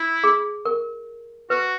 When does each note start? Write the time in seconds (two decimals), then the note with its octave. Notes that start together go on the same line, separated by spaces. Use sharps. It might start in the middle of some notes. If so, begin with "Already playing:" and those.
Already playing: E4
0.24 G#4
0.65 A#4
1.50 F#4 B4